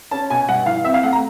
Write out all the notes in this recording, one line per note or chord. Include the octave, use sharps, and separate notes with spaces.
C#4 A5
B2 G#5
G2 F#5
E3 F5
C4 E5
F5
A3 F#5
A#5